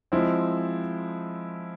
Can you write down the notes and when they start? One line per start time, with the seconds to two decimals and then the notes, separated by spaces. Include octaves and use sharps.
0.12 F3 G#3 C4 E4